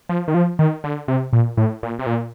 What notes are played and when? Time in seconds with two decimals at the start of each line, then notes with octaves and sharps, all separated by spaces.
0.09 F3
0.28 D#3
0.34 F3
0.59 D#3
0.84 D3
1.08 C3
1.33 A#2
1.57 A2
1.83 A#2
1.99 C3
2.06 A#2